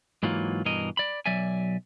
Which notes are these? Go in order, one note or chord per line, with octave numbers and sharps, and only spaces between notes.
G#2 E3 F#3 A#3 F4
G2 B2 E3 A#4 D#5
D5 B5
B1 F#3 D5 E5 G#5